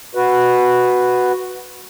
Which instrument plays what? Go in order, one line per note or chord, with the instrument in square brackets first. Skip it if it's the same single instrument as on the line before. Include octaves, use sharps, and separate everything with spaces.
[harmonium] F#4 B4